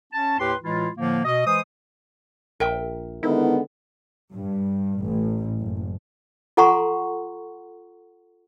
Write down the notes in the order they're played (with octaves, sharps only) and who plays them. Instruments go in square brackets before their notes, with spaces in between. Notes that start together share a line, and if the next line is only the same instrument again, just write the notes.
[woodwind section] C#4 A5
D#2 A2 G4 B4 G5 C6
A2 E3 G#3 E4 F4
A2 D3 F3 A#3
B2 D#5
E3 G#3 C5 D#6
[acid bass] A#1 [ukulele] A#4 E5 G5
[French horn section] D3 G#3 B3 [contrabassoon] D#3 [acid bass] E4
[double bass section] G2
A1
F#1
[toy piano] F4 A4 F#5 A#5 C6 C#6